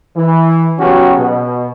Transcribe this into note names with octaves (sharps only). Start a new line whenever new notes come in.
E3
C#3 F#3 B3 C#4 F#4 G4
B2